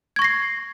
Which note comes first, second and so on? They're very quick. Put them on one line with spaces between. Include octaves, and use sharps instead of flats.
G#6 C#6 A#6 C7